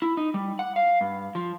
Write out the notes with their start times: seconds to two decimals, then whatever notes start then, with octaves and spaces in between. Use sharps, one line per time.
0.02 E4
0.17 D#4
0.34 G3
0.59 F#5
0.76 F5
1.01 G2
1.35 F3